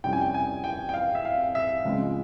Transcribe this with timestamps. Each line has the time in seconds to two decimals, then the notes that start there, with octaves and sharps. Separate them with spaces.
0.04 F2 C3 G3 C#4 E4 G5
0.13 G#5
0.21 G5
0.34 G#5
0.64 G5
0.89 G5
0.94 F5
1.15 E5
1.25 F5
1.55 E5
1.85 C#2 C#3 F3 G#3 C4